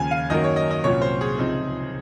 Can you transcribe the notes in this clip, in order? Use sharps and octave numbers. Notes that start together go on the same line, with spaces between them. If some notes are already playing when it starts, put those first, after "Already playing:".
Already playing: D#2 C#3 F3 G#5
F5
F#2 D#3 F#3 A#3 D#5
C#5
D#5
D#5
C2 A#2 F#3 C#4 C#5
C5
G#4
C#2 C3 F3 C4 D#4